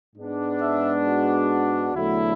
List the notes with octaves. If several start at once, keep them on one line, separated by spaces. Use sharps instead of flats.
G#2 G#3 B3 D4
E5
F#4
E2 D3 F#3 A3 E4